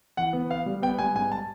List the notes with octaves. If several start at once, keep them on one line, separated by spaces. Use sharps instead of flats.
E3 F#5
B3
B3 F5
G3
B3 G5
G3 G#5
G#2 G#5
A5